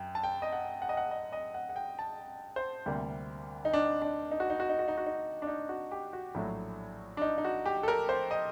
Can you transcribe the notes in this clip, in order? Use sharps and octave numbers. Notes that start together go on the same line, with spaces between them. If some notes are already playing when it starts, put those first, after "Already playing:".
Already playing: F#2 G5
A5
G5
D#5
F#5
F#5
D#5
F#5
D#5
D#5
F#5
F#5
G5
A5
C5
D2 C3 G3 A#3
D#4
D4
D4
D#4
F#4
D#4
F#4
D#4
F#4
D#4
F#4
D#4
D4
D#4
F#4
G4
F#4
A#1 A2 F#3 A3
D4
D#4
D#4
F#4
G4
A4
A#4
C5
D#5